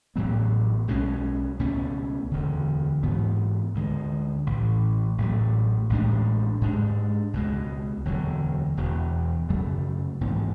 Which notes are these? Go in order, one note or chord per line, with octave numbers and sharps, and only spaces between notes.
A1 A2 F#3 B3
B1 B2 G#3 C#4
C#2 B2 A3 C#4
E1 D2 D3
G#2 E3 B3
D2 D3 G#3
A1 A2 E3
A1 A2 F#3 A3
A1 A2 G#3 D4
G#2 G#3 D4
C#2 B2 G#3
E1 D2 D3 F#3
E1 E2 B2
F#2 C#3 F#3 A3
G#1 G#2 E3 B3